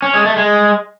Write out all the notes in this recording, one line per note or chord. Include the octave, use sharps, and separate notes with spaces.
C#4
G#3
A3
G#3